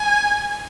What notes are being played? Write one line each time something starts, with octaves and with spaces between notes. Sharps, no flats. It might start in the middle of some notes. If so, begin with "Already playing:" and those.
Already playing: G#5